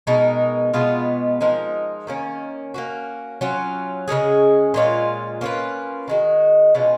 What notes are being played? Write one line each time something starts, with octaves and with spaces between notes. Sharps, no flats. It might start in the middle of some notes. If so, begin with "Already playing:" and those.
B2 G#3 D#4 A#4
B2 G#3 B3 F4
F3 G#3 D#4 A#4
D#3 A#3 C#4
A#3 C#4 F#4
F#3 C#4 F4
C#3 G#3 C#4 G#4
A#2 G#3 C#4 F4
A#3 C#4 F4 B4
D#3 G#3 D#4 F#4
B2 G#3 C#4 F4